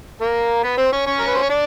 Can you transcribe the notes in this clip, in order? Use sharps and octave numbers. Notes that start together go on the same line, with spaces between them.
A#3 A#4
B3 B4
C4 C5
C#4 C#5
C#4 C#5
A#4
B4
C5
C#5
D4 D5